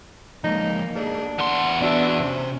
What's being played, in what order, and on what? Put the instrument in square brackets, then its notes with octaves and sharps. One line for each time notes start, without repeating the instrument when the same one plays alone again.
[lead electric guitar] F3 G#3 [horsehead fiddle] A#3 [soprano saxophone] D#4
[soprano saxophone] D4 [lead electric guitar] G#4 A4
[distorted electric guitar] E2 C6 [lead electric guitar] F#5
[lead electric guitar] B3 [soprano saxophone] D4 [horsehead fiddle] F#4 E5
[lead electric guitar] C3 C5 [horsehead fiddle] C#4